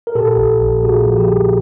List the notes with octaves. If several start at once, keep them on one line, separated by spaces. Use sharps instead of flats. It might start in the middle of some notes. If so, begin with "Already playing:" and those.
A#4
A#2 G4 A4
A#1
A#1
A#2 F#4 G#4
F3
G4
A#2